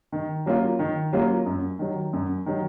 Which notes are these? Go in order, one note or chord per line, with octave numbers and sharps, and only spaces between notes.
D#3
F#3 A#3 C#4 F4
D#3
F#3 A#3 C#4 F4
F#2
D#3 F#3
F#2
D#3 F#3